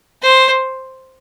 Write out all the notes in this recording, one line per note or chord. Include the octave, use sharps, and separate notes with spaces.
C5